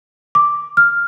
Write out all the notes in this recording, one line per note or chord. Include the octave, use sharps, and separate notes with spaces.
D6
F6